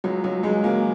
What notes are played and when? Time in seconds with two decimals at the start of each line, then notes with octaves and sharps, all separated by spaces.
0.04 C#2 F#3
0.24 C#2 F#3
0.43 C#2 G#3
0.63 C#3 F#3 A#3